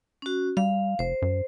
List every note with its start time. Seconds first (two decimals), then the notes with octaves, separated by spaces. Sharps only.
0.22 C#4 F#4
0.57 G3 F5
0.99 F1 C5
1.22 F#2